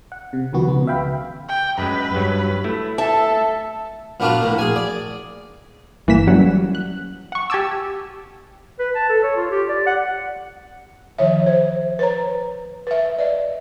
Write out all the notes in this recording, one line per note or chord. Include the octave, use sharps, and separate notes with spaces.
F#5
C3
C#2 B2 D#3 F3 B3 F#4
C#2 C#3 B3
E5 F5 G5 B5
G5
F#2 G#3 B4
G2 F#3
A3 E4
A4 E5 A5
A#2 B3 D4 F4 F#4
A2 A#3
G#4 G#5
D5
G1 E3 A#3 B6 E7
F#3 G3 C#4 F#5
F#6
F#5 C#6
G4 G#5 A5 D6 E6
B4
A5
A4
C#5
F4
G4
D5
F#5
D#3 F3 C#5 E5
C5
B4 C#5 A#5
B4 E5
D5 D#5